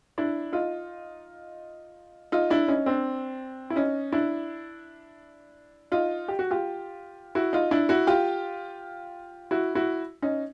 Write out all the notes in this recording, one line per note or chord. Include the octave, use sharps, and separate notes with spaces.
D4 E4
D#4 F4
D#4 F4
D4 E4
C#4 D#4
C4 D4
E4
C#4 D#4
D4 E4
D#4 F4
G4
F#4
F4 G4
E4 F#4
D#4 F4
D4 E4
E4 F#4
F4 G4
E4 F#4
E4 F#4
C#4 D#4